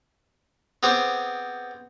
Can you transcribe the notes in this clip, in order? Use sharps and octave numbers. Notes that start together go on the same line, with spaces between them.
B3 C4 G4 G#4 C5